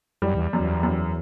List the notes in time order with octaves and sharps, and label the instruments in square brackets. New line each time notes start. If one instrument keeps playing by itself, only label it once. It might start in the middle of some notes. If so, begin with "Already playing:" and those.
[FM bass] F#2 [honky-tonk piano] G3
[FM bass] E2
[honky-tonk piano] F#2
[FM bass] E2
[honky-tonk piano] F#2